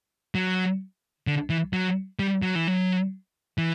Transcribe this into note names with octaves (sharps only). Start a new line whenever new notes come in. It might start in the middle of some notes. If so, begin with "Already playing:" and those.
F#3
D3
E3
F#3
G3
F#3
E3
F#3
E3